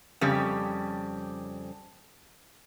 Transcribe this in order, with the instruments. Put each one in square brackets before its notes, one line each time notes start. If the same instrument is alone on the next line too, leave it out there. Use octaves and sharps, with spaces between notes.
[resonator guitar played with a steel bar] F2 C#3 G3